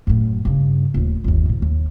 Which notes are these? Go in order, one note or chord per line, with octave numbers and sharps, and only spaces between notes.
F#2 A2
G2 C#3
D#1 A2
G1 D#2
A#2 D#3
D#2